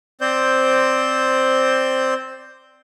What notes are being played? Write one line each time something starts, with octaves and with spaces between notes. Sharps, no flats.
C4 C5 D5 G6